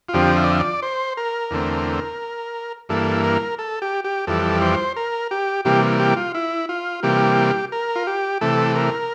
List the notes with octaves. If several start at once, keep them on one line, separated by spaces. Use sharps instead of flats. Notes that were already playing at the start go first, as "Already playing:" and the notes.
F4
F2 D3 F3 C4 G4
E5
D5
E5
D5
C5
A#4
E2 D3 A3 C4
G2 E3 A#3 A4
A#4
A4
G4
G4
F2 E3 G3 A4
C5
A#4
G4
C3 E3 G3 A#3 G4
G4
F4
E4
F4
C3 E3 G3 A#3 G4
A#4
F4
G4
C3 E3 A3 A4
A#4